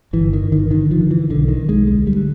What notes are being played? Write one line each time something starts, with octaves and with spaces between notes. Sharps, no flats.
G1 E3
D#3
G1
D#3
D3 D#3
F3
D3
E3
B1 D3
D#3
B1
G#3
D2 G#3
G3
D3